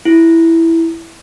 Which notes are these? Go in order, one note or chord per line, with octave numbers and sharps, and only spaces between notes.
E4